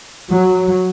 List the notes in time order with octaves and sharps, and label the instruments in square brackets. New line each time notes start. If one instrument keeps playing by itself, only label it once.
[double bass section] F#3